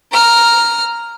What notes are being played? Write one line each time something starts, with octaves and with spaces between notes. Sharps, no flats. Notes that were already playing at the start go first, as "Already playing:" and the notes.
A#5 F6